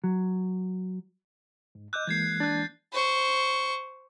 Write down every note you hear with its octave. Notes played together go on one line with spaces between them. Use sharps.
F#3
G#2
D#5 D6 E6 F#6 G6
E3 G#3 A#3 G6 G#6 C7
D4 F#6 A6
C5 C#6